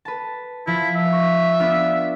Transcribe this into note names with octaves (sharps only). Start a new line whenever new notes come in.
B4 A5
F3 E4
E5
C#6 A#6
B3 D4 F4